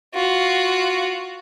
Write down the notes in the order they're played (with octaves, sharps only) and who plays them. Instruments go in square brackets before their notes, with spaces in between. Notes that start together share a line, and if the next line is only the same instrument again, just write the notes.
[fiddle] F4 F#4